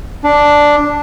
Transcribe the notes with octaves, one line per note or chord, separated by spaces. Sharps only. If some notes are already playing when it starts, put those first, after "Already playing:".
D4